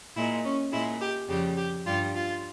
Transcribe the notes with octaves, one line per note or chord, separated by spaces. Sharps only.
A#2 G#3 E4
C#4
A#2 G#3 E4
G4
F2 C#3 G3 G4
G4
G2 G3 F4
F4